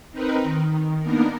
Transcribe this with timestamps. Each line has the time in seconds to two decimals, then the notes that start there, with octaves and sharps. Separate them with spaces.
0.11 C4 D#4 A#4 B4
0.43 D#3
1.01 A#3 B3 D4 D#4 A#4